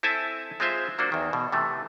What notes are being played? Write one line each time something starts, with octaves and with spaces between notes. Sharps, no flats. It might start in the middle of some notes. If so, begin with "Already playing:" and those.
C4 E4 A4 E5 G#5 A5
G#3 C4 F4 C5 E5
F#3 A#3 D4 F#4 C5
E2 D#3
B2
C3 E3 A3